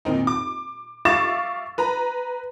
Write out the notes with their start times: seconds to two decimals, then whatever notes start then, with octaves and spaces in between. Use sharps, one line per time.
0.05 A#2 D#3 C4 D#4
0.27 D6
1.05 E5 F5 C#6 D6 A6 E7
1.78 B4 A#5